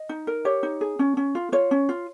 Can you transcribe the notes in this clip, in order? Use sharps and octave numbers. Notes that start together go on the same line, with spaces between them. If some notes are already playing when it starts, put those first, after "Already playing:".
Already playing: D#5
D#4
A#4
G4 C#5
D#4
G#4
C#4
C#4
F4
F4 C#5
C#4
F4